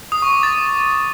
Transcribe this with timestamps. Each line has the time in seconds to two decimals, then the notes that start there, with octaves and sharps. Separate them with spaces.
0.12 D#6
0.22 C#6
0.33 D6
0.43 A6